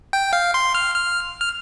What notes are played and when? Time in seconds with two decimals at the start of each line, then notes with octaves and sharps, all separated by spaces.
0.13 G5
0.33 F5
0.54 C6
0.75 F6
0.95 F6
1.40 F6